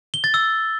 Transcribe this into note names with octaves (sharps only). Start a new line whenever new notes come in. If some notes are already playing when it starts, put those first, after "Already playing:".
G7
A6
E6